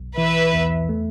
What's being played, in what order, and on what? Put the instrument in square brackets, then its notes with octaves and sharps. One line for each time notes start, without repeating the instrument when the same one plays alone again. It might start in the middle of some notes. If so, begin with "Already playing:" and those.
Already playing: [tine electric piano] B1
[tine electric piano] E3 [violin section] B4 E5
[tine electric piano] E2
A3